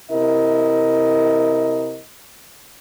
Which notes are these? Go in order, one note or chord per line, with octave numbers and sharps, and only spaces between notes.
C3 E4 A#4 D#5